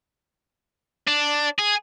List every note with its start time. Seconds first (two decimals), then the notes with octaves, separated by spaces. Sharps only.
1.07 D4
1.59 G#4